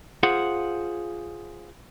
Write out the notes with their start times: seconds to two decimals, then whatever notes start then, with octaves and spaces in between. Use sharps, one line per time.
0.23 F4 G#4 C5 F5 F#5